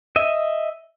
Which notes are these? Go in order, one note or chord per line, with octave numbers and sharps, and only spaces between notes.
D#5 E5